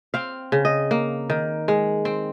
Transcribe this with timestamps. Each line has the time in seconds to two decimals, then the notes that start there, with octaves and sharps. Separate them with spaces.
0.14 C4 F5
0.52 C#3
0.65 D#5
0.91 A#3
1.30 D#3
1.68 G#3
2.05 C4